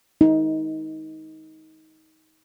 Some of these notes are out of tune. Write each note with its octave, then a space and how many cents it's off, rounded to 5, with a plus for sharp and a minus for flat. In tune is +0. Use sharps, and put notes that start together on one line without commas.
D#4 +25